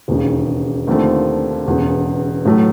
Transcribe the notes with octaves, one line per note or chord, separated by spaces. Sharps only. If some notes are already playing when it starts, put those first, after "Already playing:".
E1 D#2 C#3
D#2 D3 F3 A3 C4
E1 E2 C#3
A2 F#3 A3